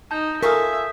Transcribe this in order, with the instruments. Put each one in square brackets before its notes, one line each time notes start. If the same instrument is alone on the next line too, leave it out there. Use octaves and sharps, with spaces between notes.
[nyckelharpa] D#4 [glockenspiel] A5 G6
[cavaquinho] F4 G#5 C#6 [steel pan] A4 A#4 [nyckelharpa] E5 [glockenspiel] D#6 B6